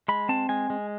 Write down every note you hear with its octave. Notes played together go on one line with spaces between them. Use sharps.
G#3 B5
C4 A5
G#3 G#5
G#3